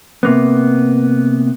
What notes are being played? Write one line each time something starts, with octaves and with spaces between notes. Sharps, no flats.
C3 A#3 B3